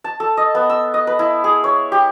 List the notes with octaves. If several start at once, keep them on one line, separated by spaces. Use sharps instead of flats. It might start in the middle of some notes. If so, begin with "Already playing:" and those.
A5
A4
D#5
B3
E6
D#5
B4
E4
G#4
C#5
G4